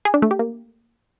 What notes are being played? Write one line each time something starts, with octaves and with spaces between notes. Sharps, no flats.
G#4
D4
A3
G4
A#3